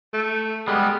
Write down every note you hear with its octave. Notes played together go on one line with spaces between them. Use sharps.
A3
G3 G#3 B3